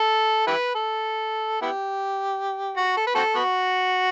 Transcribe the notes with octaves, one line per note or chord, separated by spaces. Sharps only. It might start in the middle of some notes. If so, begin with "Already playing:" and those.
Already playing: A4
E4 G4 B4
A4
B3 E4 G4
F#4
A4
B4
C4 F#4 A4
B3 F#4